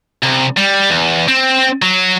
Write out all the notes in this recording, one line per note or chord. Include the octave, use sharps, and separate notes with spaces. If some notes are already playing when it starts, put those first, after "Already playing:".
C2
G3
E2
C4
F#3